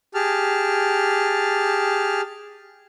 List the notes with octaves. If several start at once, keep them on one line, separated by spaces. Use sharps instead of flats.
G4 G#4 A5 F6